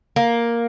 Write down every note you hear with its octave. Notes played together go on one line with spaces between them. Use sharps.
A#3